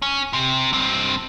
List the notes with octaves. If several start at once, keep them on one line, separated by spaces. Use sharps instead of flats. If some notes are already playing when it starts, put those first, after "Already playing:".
C#4
C3
G2 C4